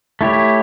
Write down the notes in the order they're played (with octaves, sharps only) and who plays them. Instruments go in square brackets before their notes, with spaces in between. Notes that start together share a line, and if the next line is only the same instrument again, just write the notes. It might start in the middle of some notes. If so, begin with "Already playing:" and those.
[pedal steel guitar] A3 E4 G4 C#5